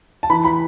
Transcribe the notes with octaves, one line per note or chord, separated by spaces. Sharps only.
A5
E3 B5
E3 B5